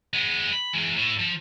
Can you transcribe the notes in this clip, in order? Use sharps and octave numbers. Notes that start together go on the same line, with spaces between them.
G#3 B3
B5
E3 G#3
A2
F3